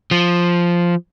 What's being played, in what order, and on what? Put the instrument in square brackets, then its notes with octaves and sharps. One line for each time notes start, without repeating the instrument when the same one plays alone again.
[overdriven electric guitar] F3